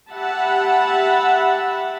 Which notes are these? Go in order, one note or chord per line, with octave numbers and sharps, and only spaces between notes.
G4 E5 F#5 A5 B5